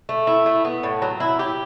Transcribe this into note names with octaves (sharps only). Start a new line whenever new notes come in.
A3
E4
A3
B3
A2
F#3
E4
G4